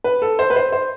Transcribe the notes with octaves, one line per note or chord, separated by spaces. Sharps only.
B4
A4
C5
B4
C5
C5